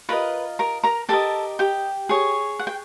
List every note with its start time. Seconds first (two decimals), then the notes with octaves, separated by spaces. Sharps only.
0.09 F4 A#4 B4 D#5 B5
0.59 A#4 A#5
0.83 A#4 A#5
1.09 G4 A4 A#4 D#5 A5
1.59 G4 G5
2.09 G#4 C#5
2.59 F#5
2.67 G5